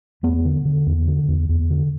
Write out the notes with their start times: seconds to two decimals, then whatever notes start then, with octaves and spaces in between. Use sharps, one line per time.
0.23 E2 B3
0.45 D3
0.65 D3
0.86 E2
1.07 D3
1.28 E2
1.49 E2
1.70 D3